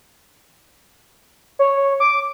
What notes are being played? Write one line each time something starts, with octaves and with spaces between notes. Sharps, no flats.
C#5
D6